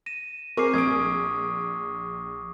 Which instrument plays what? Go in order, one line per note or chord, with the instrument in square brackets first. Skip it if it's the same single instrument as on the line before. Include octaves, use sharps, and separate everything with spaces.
[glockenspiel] A#6 D#7 E7
[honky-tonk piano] C4 G#4 A#4 [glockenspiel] C#6 D6 C7
[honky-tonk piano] A#1 D7 [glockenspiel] D#6 G#6